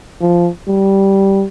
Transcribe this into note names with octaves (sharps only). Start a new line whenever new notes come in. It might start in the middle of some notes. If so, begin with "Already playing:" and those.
F3
G3